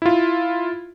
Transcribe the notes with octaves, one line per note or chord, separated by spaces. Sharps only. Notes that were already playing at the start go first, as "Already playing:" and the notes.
E4 F4